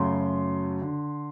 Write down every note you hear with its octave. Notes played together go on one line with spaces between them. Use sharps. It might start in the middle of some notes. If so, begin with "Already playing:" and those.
Already playing: F#2 C#3 F#3 A3 C6
D3